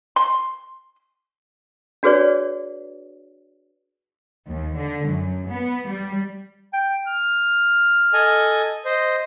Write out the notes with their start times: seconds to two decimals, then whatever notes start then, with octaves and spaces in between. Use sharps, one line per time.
0.16 C6
2.03 D4 F#4 G#4 B4 C#5 D5
4.47 D#2
4.77 D3
5.08 F#2
5.50 B3
5.89 G3
6.73 G5
7.07 F6
8.13 A4 D#5 G#5
8.85 C5 D#5